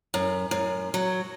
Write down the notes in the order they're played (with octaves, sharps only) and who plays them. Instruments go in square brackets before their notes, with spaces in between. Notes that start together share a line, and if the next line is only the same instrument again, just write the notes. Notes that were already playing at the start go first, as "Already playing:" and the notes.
[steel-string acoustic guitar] F#2
F#2
F#3